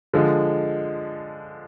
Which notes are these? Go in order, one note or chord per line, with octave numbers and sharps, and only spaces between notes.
D3 F3 G#3